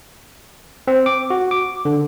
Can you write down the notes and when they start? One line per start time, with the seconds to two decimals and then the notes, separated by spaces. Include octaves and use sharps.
0.88 C4
1.06 D6
1.30 F#4
1.51 D6
1.85 D3